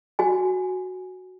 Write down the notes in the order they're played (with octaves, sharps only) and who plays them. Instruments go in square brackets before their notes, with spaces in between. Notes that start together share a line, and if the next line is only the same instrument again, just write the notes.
[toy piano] F#4 G#5